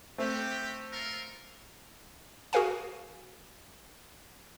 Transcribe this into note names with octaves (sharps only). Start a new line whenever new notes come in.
A3 C4 F#4 G4
F4 A4 A#4
F#4 G#4 A#4 F5 G#5